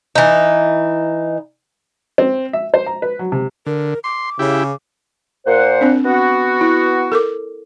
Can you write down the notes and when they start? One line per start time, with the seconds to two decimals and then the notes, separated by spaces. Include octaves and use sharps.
0.15 E3 D#4
2.18 C4
2.53 E5
2.74 C5
2.86 A#5
3.02 B4
3.19 F#3
3.32 C3
3.66 D3 A#4
4.04 C6 D6
4.39 C#3 E4 G4
5.46 A#2 C5 F#5
5.81 C4 D4
6.05 B3 F#4
6.61 E4
7.12 A4 A#4 D6